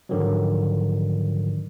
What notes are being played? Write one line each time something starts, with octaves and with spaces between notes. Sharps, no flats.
G#2 D3 D#3 F3 F#3